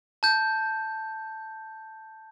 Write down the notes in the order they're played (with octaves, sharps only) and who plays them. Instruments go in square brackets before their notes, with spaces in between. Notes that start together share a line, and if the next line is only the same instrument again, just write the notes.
[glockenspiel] A5 G6